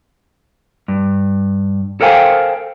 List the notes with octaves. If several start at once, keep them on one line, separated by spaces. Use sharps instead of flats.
G2
A4 A#4 C5 F5 G5 G#5